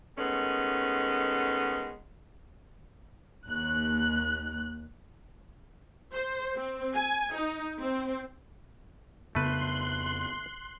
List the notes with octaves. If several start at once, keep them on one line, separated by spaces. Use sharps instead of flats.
D#3 G#3 A3 B3 C#4
D#2 F#6
C5
C4
G#5
D#4
C4
F2 C#3 A3 B3 B4 C6 F#6